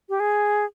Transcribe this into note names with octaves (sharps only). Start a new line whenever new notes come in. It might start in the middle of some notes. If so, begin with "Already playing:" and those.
G4
G#4